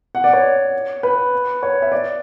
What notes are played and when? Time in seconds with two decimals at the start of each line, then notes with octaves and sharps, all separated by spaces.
0.15 F#5
0.24 D5
0.33 C#5
1.03 B4
1.63 C#5
1.82 E5
1.92 D5